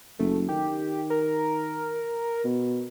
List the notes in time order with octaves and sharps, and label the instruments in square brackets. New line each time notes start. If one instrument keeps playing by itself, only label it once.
[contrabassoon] F#1 [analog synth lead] A3
[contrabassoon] D#3 [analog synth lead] G4
[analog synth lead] A#4
[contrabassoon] B2